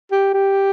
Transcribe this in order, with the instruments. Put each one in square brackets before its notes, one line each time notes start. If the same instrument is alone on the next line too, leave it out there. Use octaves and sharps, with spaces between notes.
[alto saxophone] G4
G4